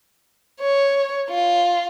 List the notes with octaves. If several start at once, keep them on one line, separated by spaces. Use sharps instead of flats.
C#5
F4